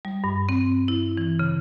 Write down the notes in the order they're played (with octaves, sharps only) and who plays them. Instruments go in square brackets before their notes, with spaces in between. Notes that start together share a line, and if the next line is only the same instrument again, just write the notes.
[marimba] G3
G2
C4
E4
E3
C#3